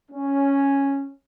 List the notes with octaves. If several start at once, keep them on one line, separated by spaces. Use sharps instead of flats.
C#4